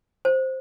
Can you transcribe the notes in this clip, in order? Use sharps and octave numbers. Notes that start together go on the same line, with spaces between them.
C5